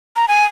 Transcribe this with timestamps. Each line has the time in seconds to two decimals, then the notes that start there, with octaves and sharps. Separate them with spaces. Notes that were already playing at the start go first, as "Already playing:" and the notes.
0.16 A#5
0.28 G#5